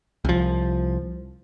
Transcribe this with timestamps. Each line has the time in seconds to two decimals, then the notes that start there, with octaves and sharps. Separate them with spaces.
0.25 C2 F3